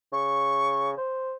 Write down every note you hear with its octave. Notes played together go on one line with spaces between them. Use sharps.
C#3 C#6
C5